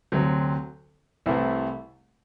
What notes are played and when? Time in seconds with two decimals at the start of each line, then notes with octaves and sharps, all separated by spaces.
0.12 D2 C3 F#3 C4
1.26 C2 C3 E3 A3 E4